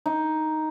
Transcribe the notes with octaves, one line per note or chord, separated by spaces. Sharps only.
D#4